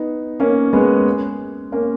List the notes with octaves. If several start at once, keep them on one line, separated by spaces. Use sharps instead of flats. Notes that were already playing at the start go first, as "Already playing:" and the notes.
Already playing: B3 D#4
A#3 C#4
G#3 B3
A#3 C#4